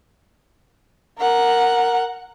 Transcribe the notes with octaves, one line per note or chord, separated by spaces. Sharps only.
A#4 F#5